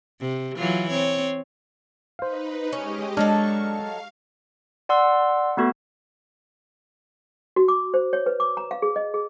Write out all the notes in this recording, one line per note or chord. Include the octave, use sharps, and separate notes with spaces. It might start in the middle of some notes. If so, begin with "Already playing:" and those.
C3
E3 F#3 F4
C4 C#5
D#4 B4 C5 F5
G#3 C#4 G4 D#5
F#3 G#3 D4 D#4 A4 D5 C#6 F6
F5
D5 F#5 C6 E6
A3 B3 F#4 A4
F#4
D6
C5
C#5
B4
D6
A#5
F5
G#4
D#5
G#4